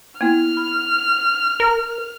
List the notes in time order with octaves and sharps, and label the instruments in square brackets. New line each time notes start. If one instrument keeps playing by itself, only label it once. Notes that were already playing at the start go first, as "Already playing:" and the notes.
[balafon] A#3 B3 E4 [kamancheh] F6
[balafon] B5
[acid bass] A#4